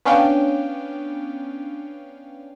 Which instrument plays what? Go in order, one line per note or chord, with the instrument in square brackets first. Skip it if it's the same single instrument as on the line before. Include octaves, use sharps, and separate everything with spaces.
[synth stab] B3 C#4 D4 F5 G5